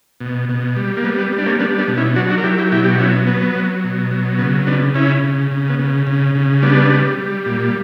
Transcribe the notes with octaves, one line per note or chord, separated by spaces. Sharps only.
B2
B2
G3
A#3
G3 B3
B3
G3
D4
A#3 C#4
G3 B3 D4
B3 D4
B2
C#4 E4
F#3 D4 F#4
D4 F#4
A#4
F#3 E4 G4
E4 G4
B2 E4 G4
G4
F#4
F#3 C#4 E4
F#3 B3
F#3
B2
F#3
C#3 B3
C#3 B3 D4
C#3 C#4 E4
C#3
C#3
B3
C#3
C#3
C#3
G3 B3 D4
G3
G3
A#2